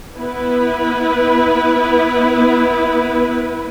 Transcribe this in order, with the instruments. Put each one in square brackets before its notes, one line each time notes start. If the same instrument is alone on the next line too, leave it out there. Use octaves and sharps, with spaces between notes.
[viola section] B3 E4 B4